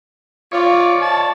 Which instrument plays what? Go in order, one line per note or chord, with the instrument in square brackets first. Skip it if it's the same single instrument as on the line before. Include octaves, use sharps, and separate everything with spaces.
[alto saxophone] F4 [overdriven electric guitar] C#5 D5
[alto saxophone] A5